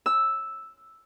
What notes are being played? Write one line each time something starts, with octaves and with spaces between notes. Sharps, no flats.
E6